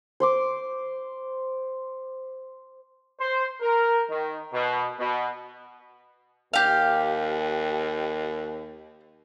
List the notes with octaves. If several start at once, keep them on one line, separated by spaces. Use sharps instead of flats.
C5 C6 D6
C5
A#4
D#3
B2
B2
D#2 G4 F5